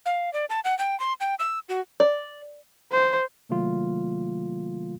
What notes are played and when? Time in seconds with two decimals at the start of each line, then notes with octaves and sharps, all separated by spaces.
0.06 F5
0.33 D5
0.50 A5
0.64 F#5
0.79 G5
1.00 C6
1.20 G5
1.39 E6
1.69 F#4
2.00 D5
2.93 C5
3.49 C3 D#3 F#3 A3 A#3 F4